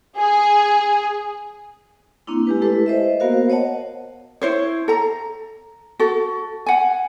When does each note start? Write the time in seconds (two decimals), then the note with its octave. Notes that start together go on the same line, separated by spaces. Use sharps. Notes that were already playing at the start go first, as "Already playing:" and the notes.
0.18 G#4
2.27 A#3 C4 D4 E4
2.47 G#3 G4 B4
2.61 A3 E4 G4 A4 B4
2.86 C5 D#5 E5
3.20 A#3 B3 F#4 A#4 C5 F5
3.49 C5 C#5 D#5 F#5 A5
4.42 E4 C5 C#5
4.88 A4 A#5
5.99 F#4 A4
6.66 F#5 G#5